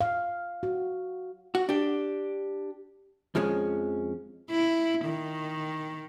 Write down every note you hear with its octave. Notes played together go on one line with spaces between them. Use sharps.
F5
F#4
F#4
D4 G4
F2 F3 G#3 C#4
E4
D#3